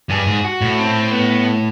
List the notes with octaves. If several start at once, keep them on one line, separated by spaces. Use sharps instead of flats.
G2 G#4
G#2
F#4
A2
C4
B3